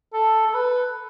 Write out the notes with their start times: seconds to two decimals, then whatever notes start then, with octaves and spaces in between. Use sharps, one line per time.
0.13 A4
0.47 A4
0.54 B4